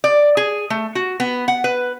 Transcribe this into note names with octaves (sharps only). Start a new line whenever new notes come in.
D5
G#4
A3
F#4
B3
F#5
B4